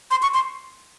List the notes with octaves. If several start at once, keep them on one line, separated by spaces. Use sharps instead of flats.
C6
C#6
C6